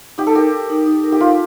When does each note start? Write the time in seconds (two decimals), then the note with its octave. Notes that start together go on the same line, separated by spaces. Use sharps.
0.18 D#4 G4
0.27 A4
0.35 G4 A#4
0.52 A#4
0.70 D#4
0.86 D#4
1.04 A#4
1.12 G4
1.20 D#4 F4